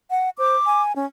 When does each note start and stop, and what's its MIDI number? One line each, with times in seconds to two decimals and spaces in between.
0.10 0.30 78
0.39 0.56 72
0.39 0.83 86
0.66 0.92 80
0.96 1.06 61